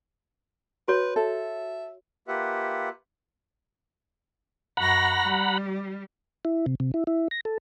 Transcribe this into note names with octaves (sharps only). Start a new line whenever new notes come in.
F#4 B4 C#5
A4 E5
A#3 F4 G4 B4 E5 F#5
F#2 F#5 A#5 B5 C#6 A#6
G3
E4
C3
C3
E4
E4
A#6
A4